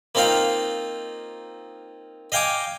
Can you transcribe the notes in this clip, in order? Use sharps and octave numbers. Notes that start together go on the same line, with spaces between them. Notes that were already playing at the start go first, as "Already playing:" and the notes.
A#3 C4 D#4 F4 F5 G5
D#5 F5 G5 G#5 D6